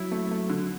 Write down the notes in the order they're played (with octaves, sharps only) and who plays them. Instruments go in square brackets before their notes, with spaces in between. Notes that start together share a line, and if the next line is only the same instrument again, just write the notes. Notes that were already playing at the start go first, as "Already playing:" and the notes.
Already playing: [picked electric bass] F#3 [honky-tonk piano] E4
[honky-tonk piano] A3
A3
D3